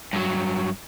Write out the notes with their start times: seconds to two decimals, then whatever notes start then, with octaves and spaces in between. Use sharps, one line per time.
0.13 G2 F#3